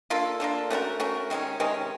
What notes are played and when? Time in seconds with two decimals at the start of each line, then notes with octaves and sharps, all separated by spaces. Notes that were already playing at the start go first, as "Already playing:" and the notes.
0.10 A#3 D4 F4 A4
0.40 A#3 D4 F4 A4
0.70 A3 C#4 F#4 A#4
1.00 A3 C#4 F#4 A#4
1.30 C3 D#3 G#3 C#4
1.60 C3 D#3 G#3 C#4